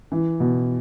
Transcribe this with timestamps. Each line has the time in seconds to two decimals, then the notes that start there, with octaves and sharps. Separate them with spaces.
0.12 E3
0.40 B2